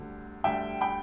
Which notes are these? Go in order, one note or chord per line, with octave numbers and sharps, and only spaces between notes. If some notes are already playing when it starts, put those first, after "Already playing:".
Already playing: D2 D3 G3
D2 D3 G3 E5 G5
G5 B5